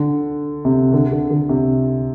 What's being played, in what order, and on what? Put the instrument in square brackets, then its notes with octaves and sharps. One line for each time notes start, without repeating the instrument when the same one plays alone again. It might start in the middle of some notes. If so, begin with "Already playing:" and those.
Already playing: [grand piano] D3
C3
D3
D3
D3
C3